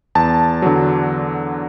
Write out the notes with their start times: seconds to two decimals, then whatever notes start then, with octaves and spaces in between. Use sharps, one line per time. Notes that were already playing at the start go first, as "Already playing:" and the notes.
0.15 E2 A5
0.62 D3 F#3